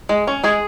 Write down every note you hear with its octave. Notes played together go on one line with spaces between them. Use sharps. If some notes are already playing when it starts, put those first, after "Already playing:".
G#3
C#4
G#3 G#4